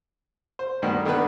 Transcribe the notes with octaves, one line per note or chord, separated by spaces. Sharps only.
C5
D2 G2 D#3 G3 B3
D3 D#3 B3 D4 B4